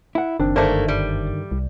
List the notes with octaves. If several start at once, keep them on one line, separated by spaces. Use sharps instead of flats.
E4 F#5
F#1 D#3 C4 D4
G2 D3 D#3 A3 A#3 C5 D5 A5
G3
C2